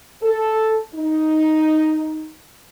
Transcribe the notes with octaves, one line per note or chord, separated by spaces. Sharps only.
A4
D#4